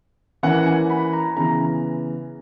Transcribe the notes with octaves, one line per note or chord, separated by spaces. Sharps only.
E3 A#3 C#4 F#5
G#5
B5
A#5
C#3 E3 B3 A#5